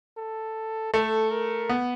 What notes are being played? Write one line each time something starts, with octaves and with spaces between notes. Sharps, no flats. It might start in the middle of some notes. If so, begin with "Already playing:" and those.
A4
A3 A4
A#4
B3